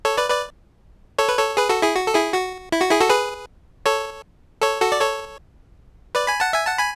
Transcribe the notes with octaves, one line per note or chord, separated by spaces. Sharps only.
A4 C#5
B4 D5
B4 D5
A4 C#5
B4
A4 C#5
G#4 B4
F#4 A4
E4 G#4
F#4
A4
E4 G#4
F#4
E4
F#4
E4 G#4
F#4 A4
G#4 B4
A4 C#5
A4 C#5
F#4 A4
D5
A4 C#5
B4 D5
G#5 B5
F#5 A5
E5 G#5
F#5 A5
G#5 B5